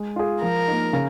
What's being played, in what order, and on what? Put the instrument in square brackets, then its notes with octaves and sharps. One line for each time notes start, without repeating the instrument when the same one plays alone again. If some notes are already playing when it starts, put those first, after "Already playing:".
Already playing: [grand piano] G#3
F4 G#4
[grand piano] F3 [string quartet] A#4
[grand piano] A#3 D#4
C#3